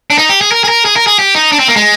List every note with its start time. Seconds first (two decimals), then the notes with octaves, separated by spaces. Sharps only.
0.10 D4
0.18 D#4
0.29 G4
0.41 G#4
0.52 A#4
0.64 G#4
0.68 A#4
0.85 G#4
0.96 A#4
1.07 G#4
1.19 G4
1.35 D#4
1.52 D4
1.59 C4
1.68 A#3
1.76 G#3